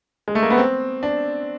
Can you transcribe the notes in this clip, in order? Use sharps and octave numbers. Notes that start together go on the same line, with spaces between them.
G#3
A3
A#3
B3
C4
D4